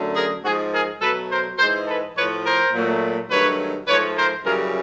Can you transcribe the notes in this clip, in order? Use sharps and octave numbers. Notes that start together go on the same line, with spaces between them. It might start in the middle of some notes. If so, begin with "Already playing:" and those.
Already playing: F#2 D3 F#3 A3
G#4 A#4
G#2 F3 G#3 F#4 G#4
G#4 A#4
B2 F#3 A3 A4 B4
A#4 C5
G#2 E3 G#3 A#4 C5
A4 B4
A2 F3 A3 B4 C#5
A#4 C5
A#2 F#3 A3
G2 D#3 F#3 A3 B4 C#5
G#2 F3 A3 B4 C#5
A#4 C5
F#2 C#3 E3 G3 G#4 A#4